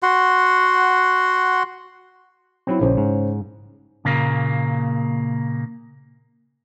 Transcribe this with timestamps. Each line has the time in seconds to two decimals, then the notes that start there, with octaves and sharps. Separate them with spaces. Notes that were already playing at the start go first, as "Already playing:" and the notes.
0.03 F#4 F#5 C6
2.67 F#3 C4 E4 C#5
2.81 A#1 C#3 C5 C#5
2.97 G#2
4.05 A#2 C#3 A#3